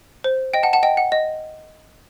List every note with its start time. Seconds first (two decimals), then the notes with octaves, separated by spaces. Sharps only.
0.24 C5
0.54 D#5 G5
0.63 F#5 A5
0.73 F#5 A5
0.83 D#5 G5
0.97 F#5
1.12 D#5